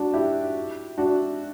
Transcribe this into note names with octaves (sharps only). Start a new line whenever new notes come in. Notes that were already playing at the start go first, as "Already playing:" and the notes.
Already playing: D4 F#4
E4 G4
D4 F#4